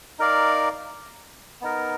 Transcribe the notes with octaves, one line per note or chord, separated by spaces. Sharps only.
D#4 A#4 D5 F5
B3 D#4 A#4